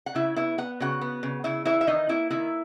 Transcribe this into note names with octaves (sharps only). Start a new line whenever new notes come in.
F#5
C#3 E4 E5
B3 E4 E5
B3 F#5
C#3 F#4 F#5
B3
C#3
C#3 E4 E5
E3 E4 E5
E5
D#3 D#4 D#5
A#3 E4 E5
D#3 E4 E5